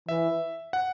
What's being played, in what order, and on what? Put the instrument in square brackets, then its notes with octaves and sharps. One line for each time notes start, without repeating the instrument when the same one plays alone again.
[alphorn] E3 [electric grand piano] E5
[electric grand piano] F#5